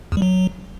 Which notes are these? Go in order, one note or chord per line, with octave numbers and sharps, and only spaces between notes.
E2
G3
F#3